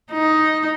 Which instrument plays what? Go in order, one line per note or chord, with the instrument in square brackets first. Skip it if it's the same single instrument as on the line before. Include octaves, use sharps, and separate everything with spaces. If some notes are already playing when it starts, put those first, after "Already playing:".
[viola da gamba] D#4